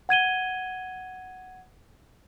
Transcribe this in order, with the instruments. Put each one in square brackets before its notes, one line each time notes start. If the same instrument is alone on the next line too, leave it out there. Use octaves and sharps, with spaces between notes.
[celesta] F#5 G#6 D#7 G7